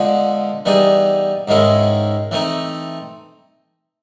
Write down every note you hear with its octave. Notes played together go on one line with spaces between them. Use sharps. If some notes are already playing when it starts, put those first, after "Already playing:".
Already playing: D3 F3 G#3 B3
E3 G3 B3 D#4 G#4
G#2 D#3 G#3 C#4 E4
E3 A3 C4 D#4